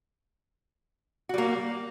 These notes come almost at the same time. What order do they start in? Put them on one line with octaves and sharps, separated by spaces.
F#4 G3 A#3